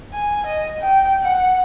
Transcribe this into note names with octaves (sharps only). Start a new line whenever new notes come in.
G#5
D#5
G5
F#5